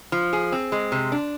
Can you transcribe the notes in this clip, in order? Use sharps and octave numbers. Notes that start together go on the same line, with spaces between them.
F3
G#4
C4
G#3
C3
D4